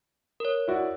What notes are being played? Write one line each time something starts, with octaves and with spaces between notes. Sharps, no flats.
A#4 C#5
E4 F#4 D5